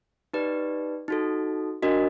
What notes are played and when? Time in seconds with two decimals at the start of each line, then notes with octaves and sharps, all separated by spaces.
0.33 D#4 G4 B4 D5
1.08 D#4 F#4 A4
1.83 D4 F#4 A#4 D#5